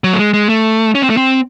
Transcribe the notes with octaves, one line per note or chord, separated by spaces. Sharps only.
F#3
A3
G#3
G#3
A3
C#4
C4
A3
C4